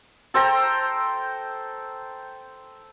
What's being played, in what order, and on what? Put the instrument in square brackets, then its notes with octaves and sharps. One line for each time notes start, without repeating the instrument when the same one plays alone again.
[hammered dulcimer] A4 C5 G5 A#5